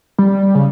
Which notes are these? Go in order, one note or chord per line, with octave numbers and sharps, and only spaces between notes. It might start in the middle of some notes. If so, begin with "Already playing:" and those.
G3
C#3